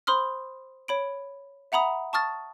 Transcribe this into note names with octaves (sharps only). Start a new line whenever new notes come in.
C5 B5 C6 D#6 F6
C#5 B5 D7
E5 F#5 A#5 B5 D#6
A5 C#6 D#6 F6 A6